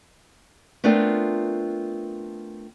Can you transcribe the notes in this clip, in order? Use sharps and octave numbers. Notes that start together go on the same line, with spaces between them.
A3 B3 C4 D4 F4 A#4